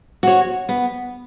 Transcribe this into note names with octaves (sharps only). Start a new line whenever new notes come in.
F#4 C#5
B3